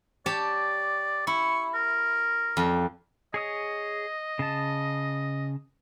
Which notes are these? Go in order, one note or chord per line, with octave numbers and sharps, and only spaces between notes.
G4 C#5 D5 A5
E4 C#6
A#4
F2 D5
G#4 C#5 D#5 D#6
C#3 A5